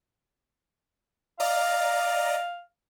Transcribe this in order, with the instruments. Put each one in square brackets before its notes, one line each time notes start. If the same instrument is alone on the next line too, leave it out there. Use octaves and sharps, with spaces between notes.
[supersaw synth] D5 D#5 A#5 [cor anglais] F5